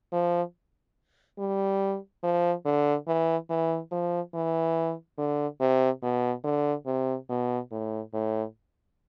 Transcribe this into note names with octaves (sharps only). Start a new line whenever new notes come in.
F3
G3
F3
D3
E3
E3
F3
E3
D3
C3
B2
D3
C3
B2
A2
A2